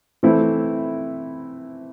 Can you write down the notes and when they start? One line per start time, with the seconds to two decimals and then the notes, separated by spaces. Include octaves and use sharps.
0.23 E3 A3 C4 E4